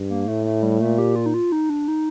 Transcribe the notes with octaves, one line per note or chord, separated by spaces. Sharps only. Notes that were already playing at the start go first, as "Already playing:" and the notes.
Already playing: G2
A#3
A2 A3
A3
G3
A#2 A3
G4
F4
D#4
F4
D#4
D4
D#4